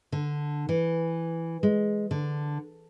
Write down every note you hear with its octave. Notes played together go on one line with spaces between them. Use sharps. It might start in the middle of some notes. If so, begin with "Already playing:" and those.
D3
E3
G#3
D3